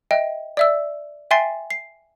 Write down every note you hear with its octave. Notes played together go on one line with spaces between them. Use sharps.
D#5 E5 G5
D5 E5 E6
E5 G5 G#5 C6 A6 C7
C7